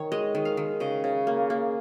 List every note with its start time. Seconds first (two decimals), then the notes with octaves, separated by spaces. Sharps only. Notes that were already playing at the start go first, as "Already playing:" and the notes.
Already playing: D#3 C#5
0.12 G#3 D#5
0.35 D#3
0.45 F5
0.57 D#3
0.80 C#3 D#5
1.04 C#3
1.27 A#3
1.50 A#3